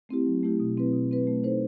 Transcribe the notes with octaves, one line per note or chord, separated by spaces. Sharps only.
A3 C4 E4 G4
F#3
A3 C4 E4 G4
B2
F#3 C4 E4 B4
B2
F#3 C4 E4 B4
A3
D#4 A4 C5